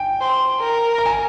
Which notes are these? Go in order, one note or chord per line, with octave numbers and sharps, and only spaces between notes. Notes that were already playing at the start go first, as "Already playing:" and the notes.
Already playing: G5 G#5
C5
A#4
A#5
G#5